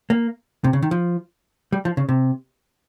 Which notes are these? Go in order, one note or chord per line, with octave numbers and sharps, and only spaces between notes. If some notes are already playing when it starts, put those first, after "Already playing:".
A#3
C3
C#3
D#3
F3
G3
F3
C#3
C3